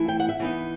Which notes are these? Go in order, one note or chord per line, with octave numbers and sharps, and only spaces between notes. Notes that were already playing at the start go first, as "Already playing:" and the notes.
Already playing: E3 A3 E4
G5
F#5
E5
E3 B3 D#4